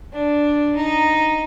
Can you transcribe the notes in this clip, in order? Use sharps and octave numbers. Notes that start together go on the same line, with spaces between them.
D4
D#4